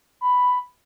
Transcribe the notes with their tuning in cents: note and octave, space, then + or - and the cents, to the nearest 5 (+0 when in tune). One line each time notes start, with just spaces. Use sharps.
B5 +5